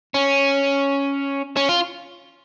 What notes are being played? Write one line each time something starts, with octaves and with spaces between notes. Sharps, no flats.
C#4
C#4
F4